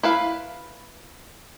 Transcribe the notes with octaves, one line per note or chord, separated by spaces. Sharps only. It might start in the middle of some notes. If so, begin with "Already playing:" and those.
E4 B4 F5